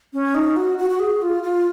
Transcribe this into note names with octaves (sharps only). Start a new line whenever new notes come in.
C#4
D#4
F#4
F#4
F#4
G#4
F4
F4